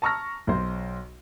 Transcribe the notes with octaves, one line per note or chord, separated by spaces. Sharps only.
A5 A#5 C#6 E6 F6 A#6
B1 C5